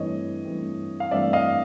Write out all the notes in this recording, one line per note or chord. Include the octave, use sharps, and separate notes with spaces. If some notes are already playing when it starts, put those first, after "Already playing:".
Already playing: G2 E3 A3 C4 C#5 D#5
G2 E3 A3 C4
F5
G2 E3 A3 C4 D5 E5
D#5 F5